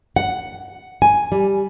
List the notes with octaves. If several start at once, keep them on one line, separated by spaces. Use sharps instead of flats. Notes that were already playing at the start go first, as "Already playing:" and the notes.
F#5
G#5
G3